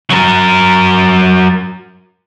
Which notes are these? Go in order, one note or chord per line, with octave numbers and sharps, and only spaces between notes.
F#3 A#4